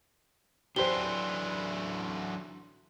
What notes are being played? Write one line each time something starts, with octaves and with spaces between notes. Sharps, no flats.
D3 E3 F#3 D4 G4 C5 C6 G7